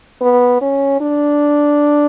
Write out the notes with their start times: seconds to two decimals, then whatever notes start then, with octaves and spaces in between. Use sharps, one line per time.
0.21 B3
0.61 C#4
1.00 D4